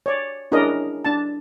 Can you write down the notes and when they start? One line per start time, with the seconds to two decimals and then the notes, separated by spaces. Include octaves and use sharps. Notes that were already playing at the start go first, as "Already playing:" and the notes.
0.06 C#5 D5
0.52 C#4 D4 E4 G#4 A#4 D#5
1.05 D4 A5